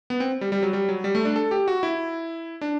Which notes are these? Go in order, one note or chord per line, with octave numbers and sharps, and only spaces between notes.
B3
C4
G3
G3
F#3
G3
F#3
G3
A3
D4
A4
G4
F#4
E4
D4